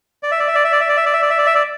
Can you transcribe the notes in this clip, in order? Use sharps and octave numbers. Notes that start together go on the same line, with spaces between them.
D5
E5
D5
E5
D5
E5
D5
E5
D5
E5
D5
E5
D5
E5
D5
E5
D5